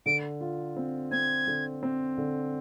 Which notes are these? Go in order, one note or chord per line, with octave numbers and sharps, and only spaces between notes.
D3 D7
F4
C4
C4 G#6
D3
C4
D3